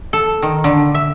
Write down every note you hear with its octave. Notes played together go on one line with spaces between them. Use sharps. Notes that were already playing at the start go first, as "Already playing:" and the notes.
A4
D#3
D3
E5